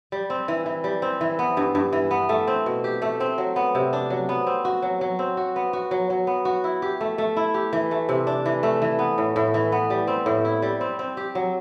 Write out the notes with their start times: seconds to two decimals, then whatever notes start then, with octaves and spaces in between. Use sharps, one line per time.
0.12 G3
0.30 C4
0.48 E3
0.66 E3
0.84 G3
1.02 C4
1.21 E3
1.39 B3
1.57 G2
1.75 G2
1.93 E3
2.11 B3
2.29 A3
2.47 C4
2.66 B2
2.84 G4
3.02 A3
3.20 C4
3.38 F#3
3.56 B3
3.75 C3
3.93 D4
4.10 F#3
4.29 B3
4.47 C4
4.65 F#4
4.82 F#3
5.01 F#3
5.19 C4
5.37 F#4
5.56 B3
5.73 F#4
5.91 F#3
6.10 F#3
6.27 B3
6.45 F#4
6.64 E4
6.82 G4
7.01 A3
7.18 A3
7.37 E4
7.54 G4
7.73 E3
7.91 A3
8.09 C3
8.27 D4
8.46 E3
8.63 A3
8.82 E3
8.99 B3
9.18 A2
9.36 A2
9.54 E3
9.72 B3
9.90 G3
10.07 C4
10.26 A2
10.45 E4
10.62 G3
10.81 C4
10.99 C4
11.17 G4
11.35 F#3